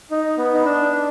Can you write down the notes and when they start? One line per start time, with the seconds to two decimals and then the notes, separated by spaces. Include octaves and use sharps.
0.11 D#4
0.37 B3
0.54 D#4
0.65 D4
0.91 D4